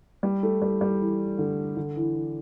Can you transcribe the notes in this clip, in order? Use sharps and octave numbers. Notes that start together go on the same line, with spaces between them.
G3
A3
G3
G3
E3
D3
D3
E3
E3